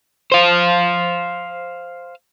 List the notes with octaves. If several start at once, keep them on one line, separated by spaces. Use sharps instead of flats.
C5 F5